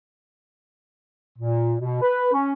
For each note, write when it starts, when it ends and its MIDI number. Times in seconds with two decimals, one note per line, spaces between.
1.39 1.74 46
1.80 1.99 47
2.01 2.30 71
2.33 2.52 61